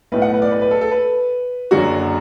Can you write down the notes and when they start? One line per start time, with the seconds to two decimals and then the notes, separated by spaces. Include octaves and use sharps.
0.12 B1 A2 A3 B4
0.22 F#5
0.33 B4
0.42 D5
0.51 B4
0.61 B4
0.71 A4
0.81 A4
0.91 B4
1.71 F#1 F#2 D3 F#3 F#4